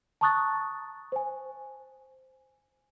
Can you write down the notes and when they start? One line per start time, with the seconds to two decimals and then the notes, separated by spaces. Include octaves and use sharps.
0.21 A5 A#5 C#6 D#6 F#6 A6
1.12 C5 G#5